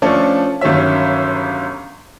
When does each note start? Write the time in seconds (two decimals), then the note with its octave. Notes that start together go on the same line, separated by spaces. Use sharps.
0.02 F3 A3 C#4 D4 A4
0.61 G1 D#3 F#3 C#4 E5